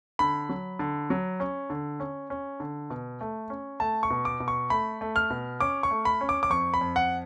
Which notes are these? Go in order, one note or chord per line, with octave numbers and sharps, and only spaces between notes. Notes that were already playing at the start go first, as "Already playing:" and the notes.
D3 B5
F#3
D3
F#3
C#4
D3
C#4
C#4
D3
B2
A3
C#4
A3 A5
C#6
B2
D6
B2
C#6
A3 B5
A3
F6
B2
C#4 D6
C#6
A3
B5
C#4
D6
D6
F2 C#6
B5
F2
F#5